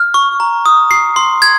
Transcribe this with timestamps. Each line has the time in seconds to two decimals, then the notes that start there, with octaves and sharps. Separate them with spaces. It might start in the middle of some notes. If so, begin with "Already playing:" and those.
Already playing: F6
0.14 C#6
0.40 A#5
0.66 D#6
0.91 C7
1.16 C6
1.42 G#6